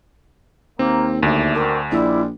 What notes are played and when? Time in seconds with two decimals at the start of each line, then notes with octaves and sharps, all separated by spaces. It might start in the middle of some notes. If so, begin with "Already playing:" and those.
0.79 D#2 A#3 C4
1.23 D2 D4 E5
1.55 C4 D4 F#4 A#4
1.91 A#1 G3 G#3 E4 D5